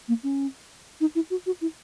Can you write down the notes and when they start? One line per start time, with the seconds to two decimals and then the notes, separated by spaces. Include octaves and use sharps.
0.08 A#3
0.23 C#4
1.01 D#4
1.15 E4
1.30 F#4
1.46 F#4
1.61 E4